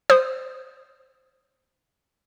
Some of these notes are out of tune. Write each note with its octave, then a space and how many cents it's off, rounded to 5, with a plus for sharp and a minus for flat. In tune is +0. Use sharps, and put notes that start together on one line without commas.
C5 -10 D#6 -15